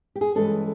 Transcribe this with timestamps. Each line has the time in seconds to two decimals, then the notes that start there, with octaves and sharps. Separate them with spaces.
0.16 G4
0.21 G#4
0.35 G2 E3 G#3 C#4 A4